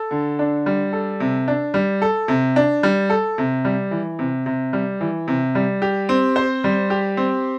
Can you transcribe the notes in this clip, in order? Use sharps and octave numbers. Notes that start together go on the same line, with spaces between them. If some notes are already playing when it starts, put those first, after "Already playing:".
Already playing: A4
D3
D4
G3
A4
C3
D4
G3
A4
C3
D4
G3
A4
C3
G3
E3
C3
C3
G3
E3
C3
G3
G4
C4
C5
G3
G4
C4